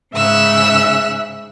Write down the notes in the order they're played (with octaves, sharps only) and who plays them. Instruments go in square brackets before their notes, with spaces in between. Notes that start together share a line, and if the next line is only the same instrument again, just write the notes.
[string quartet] G#2 C#3 E5 E6 F#6